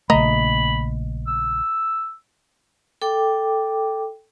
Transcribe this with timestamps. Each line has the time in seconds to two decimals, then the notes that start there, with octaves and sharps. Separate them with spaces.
0.10 A#1 C#3 A3 D#5 A#5 B5
1.27 E6
3.02 A4 G5 D6